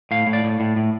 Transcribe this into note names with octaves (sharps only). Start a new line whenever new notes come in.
A2 F5
A2
D5
A2
A2
A2